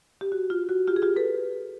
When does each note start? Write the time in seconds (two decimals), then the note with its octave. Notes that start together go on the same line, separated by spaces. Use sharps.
0.21 G4
0.32 F#4
0.50 F4
0.69 F#4
0.88 F4 G4
0.96 G#4
1.02 F4 G4
1.16 A4 B4